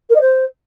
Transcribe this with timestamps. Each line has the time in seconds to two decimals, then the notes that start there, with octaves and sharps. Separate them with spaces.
0.09 A#4
0.15 D#5
0.20 C5